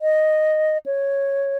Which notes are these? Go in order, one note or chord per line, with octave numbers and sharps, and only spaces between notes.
D#5
C#5